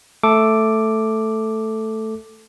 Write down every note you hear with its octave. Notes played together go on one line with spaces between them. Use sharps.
A3 A4 D6